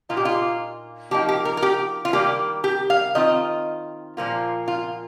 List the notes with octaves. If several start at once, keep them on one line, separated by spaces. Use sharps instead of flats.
A#2 A#3 D#4 F4
G4
F4
F3 A#3 D#4 G4
G4
A#4
A#4
G4
F4
D#3 G3 A#3 G4
G4
F5
D#3 C4 F4 D#5
A#2 F3 A#3 F4
F4